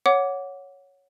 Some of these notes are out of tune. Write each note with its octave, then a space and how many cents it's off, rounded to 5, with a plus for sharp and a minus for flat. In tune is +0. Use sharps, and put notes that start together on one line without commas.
C#5 +0 F#5 -10 D6 -15